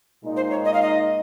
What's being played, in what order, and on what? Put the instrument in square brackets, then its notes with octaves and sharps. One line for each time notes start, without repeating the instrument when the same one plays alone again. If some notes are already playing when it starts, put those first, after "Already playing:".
[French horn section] A#2 G#3 D#4
[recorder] C5
C#5
D#5
F5
D#5